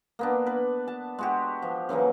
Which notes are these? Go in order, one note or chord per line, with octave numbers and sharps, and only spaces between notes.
A#3 B3 D4
B4
A5
G#3 F#4 G4
F3
C#3 E3 F#3 A#3